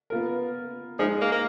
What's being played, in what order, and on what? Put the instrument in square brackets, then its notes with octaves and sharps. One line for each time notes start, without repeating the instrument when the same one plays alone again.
[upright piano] B3 F4 A#4
[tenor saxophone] F3 [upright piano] G#3 D#4 G#4 D#5
[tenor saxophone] A#3
A#3